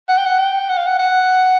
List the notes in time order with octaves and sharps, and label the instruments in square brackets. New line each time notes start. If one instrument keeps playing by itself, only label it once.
[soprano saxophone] F#5
G5
F#5
G5
F#5
F5
F#5
F#5